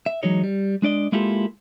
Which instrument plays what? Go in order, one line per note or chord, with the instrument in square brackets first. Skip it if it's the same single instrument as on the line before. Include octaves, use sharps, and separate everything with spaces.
[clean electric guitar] E5
E3 F#3 G#3 D#4 C#5 D#5
G3
G#3 D4 D5 D#5
G#3 A#3 E4 F4 G4 A4